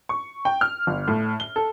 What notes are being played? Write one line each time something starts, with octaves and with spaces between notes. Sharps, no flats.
C#6
G5
F6
G1
A2
G7
A4